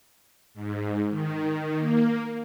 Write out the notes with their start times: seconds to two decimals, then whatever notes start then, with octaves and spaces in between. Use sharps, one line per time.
0.54 G#2
1.11 D#3
1.76 A#3